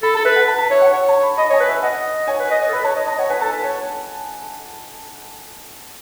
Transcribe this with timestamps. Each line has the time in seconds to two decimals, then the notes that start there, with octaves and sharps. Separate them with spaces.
0.02 A4 B5
0.14 A4 A5
0.25 B4 E5
0.36 F#5
0.47 B4 A5
0.58 A5
0.70 C#5 E5
0.82 F#5
0.93 C#5 F#5
1.08 A5
1.23 B5
1.38 D#5 B5
1.50 C#5
1.53 G#5
1.60 B4
1.69 E5
1.83 D#5 F#5
2.28 C#5 G#5
2.40 B4
2.51 D#5
2.62 C#5
2.69 A4
2.73 B4 B5
2.84 C#5 A5
2.96 D#5
3.07 D#5 A5
3.18 C#5 F#5
3.30 B4 G#5
3.41 A4 A5
3.52 B4
3.63 C#5